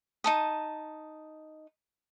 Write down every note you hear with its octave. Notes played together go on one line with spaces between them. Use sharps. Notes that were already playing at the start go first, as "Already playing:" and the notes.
D#4 A5 D#6